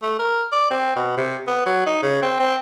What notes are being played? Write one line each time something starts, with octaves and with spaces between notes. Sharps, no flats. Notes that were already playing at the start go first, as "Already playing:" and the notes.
A3
A#4
D5
C4
B2
C3
B3
F#3
D#4
C#3
C4
C4